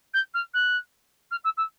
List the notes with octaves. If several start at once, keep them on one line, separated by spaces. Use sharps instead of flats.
G6
F6
F#6
F6
E6
E6